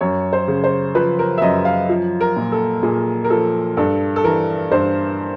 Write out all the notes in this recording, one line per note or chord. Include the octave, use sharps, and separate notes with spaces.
F#2 C#5
C5
C#3
C5
F3 B4
A#4
E5
F#2 D#5
F5
F3
A#4
A#2
A4
A#2 G#4
A#4
F3 A4
G2 A4
A4
E3 A#4
G2 C5